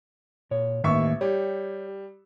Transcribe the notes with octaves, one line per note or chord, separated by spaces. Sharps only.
A#2 C#5
A1 D#3 A#3 E5 C#6
G3 G4 C#5